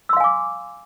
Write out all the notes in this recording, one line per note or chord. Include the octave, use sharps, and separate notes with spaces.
F5 G#5 C6 D6 E6